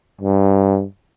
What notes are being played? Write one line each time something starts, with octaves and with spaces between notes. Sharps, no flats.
G2